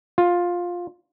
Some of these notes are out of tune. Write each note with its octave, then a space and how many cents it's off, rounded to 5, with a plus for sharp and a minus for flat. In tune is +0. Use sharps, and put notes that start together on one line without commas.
F4 +10